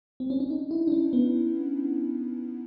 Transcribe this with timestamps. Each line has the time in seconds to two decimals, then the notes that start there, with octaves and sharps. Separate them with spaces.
0.20 C4
0.30 C#4
0.40 D4
0.50 D#4
0.71 E4
0.87 D4
0.92 C#4
1.13 B3